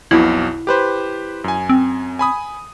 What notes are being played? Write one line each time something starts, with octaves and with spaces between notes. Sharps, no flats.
B1 F2 B2 E4
G4 B4 C5
F#2 G#5
C4
G#5 B5 D#6